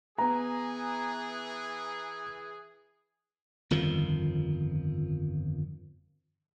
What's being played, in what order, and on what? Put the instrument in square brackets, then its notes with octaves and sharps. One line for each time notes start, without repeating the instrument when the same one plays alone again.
[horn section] E3 G#4 [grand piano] B3 A#5
[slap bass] G1 F2 D#3 F3